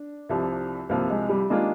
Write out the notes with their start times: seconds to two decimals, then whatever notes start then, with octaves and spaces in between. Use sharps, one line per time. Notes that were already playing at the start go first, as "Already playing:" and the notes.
Already playing: D4
0.29 C2 C3 F3
0.89 C2 C3 F3 A#3
1.10 G#3
1.29 G3
1.50 D#3 G#3 A#3 D4 F4